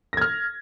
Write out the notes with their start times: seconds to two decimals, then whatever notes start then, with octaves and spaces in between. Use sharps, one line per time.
0.13 A#6
0.17 G#6
0.21 F6